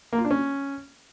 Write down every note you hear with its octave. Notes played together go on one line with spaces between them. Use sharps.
A#3
F4
D4
C#4